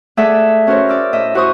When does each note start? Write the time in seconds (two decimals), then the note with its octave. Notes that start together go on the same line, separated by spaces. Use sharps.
0.17 A3 G#4 A4 D5 E5 F#5
0.67 C#4 F#4 A#4 C5 C#5
0.89 D5 E6 F6
1.13 A2 D#5 E5
1.34 E4 F#4 C5 C#6 D#6